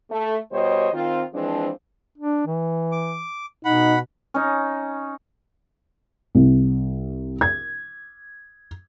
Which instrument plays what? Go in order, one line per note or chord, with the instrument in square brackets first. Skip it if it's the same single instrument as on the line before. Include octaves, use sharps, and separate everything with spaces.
[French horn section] A3
B2 G3 G4 C5 C#5 D#5
D#3 C4 F4
E3 F3 G#3 C4 D4
[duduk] D4
E3
[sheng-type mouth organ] D6
[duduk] B2 [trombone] D#4 [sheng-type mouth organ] F#5 B5
[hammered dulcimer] C#4 D#4
[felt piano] C2
G#6